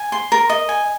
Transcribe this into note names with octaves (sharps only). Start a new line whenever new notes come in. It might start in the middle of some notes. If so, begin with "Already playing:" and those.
Already playing: G#5
C6
A#4
D#5
G#5